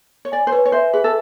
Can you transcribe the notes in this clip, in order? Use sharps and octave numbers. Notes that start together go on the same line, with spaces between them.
C#5
D5 G#5
C5
B4 C#5
C#5
C5 E5
G#4 B4
A4